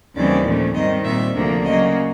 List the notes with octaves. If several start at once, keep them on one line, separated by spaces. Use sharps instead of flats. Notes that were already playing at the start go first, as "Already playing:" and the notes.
D#2 C#3 E3 G3 C4 D5
A#2 F3 A3 C#4
G#2 D#3 G3 C4 D#5
A#2 G3 C4 E5
D2 C3 F3 A#3 D4
C#3 F#3 A#3 D#5